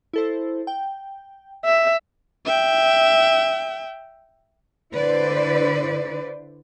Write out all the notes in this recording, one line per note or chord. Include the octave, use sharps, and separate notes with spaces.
E4 A4 C5
G5
E5
E5 G5
D3 E4 B4 C5 D5